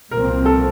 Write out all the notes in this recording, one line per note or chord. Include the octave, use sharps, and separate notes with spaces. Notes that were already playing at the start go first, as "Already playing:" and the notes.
C2 A#2 F3 C4 A#4
A4